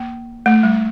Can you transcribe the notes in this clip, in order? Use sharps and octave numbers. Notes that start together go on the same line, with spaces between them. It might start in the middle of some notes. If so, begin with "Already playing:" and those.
Already playing: A#3
A3
G3